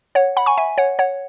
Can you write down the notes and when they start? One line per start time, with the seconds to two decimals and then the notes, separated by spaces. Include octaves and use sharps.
0.15 C#5 F#5
0.37 F#5 B5
0.46 G#5 C#6
0.57 E5 G#5
0.78 C#5 F#5
0.99 C#5 F#5